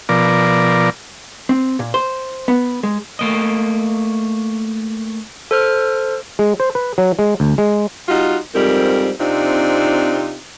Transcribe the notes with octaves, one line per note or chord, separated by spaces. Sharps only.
B2 F3 A#4 D5
C4
A#2
C5
B3
G#3
A3 A#3 D#5
A4 C5 F6
G#3
C5
B4
F#3
G#3
D2
G#3
G3 D#4 F4 F#4
F2 G#2 G3 C4 A#4
C3 C4 D4 D#4 F4